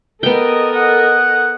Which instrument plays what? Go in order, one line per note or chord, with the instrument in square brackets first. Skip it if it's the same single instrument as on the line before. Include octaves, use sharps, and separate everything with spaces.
[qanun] B3 G5 [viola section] A4 A#4 D#5
[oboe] F#5